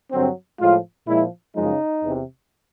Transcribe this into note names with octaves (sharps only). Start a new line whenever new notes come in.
G2 D3 F#3 C4
A2 F3 G#3 F4
A#2 F3 G#3 E4
F#2 C#3 F3 G#3 D#4
E2 C3 E3